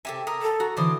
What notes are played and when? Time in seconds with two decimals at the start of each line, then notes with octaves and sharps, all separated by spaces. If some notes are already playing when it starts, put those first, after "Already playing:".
0.05 C3 G4 A4 E5 G#5
0.27 A#4 D#6 E6
0.42 A4
0.60 F#4 A#5
0.77 D3 E3 C5 D5 D#6